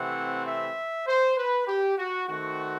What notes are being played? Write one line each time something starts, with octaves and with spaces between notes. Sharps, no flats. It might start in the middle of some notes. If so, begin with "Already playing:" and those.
Already playing: C3 E3 A3 C4 F#5
E5
C5
B4
G4
F#4
D#3 A3 C4 F#4